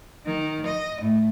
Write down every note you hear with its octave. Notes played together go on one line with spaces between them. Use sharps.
D#3
D#5
A2